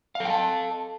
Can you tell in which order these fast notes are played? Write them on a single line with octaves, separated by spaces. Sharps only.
F5 A4 G5 A5